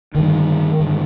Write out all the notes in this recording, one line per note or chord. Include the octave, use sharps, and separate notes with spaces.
G2 D3 D#3
G2 D3